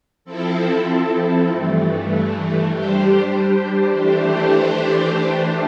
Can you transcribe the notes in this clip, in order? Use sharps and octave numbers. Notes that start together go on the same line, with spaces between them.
F3 C4 E4 A4
G2 E3 A3
G3 D4 G4 C5
E3 A3 D4 G4 C5